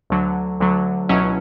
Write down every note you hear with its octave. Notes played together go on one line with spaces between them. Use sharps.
D2 D3 F#3
D2 D3 F#3
C#2 B2 F#3 C#4 E4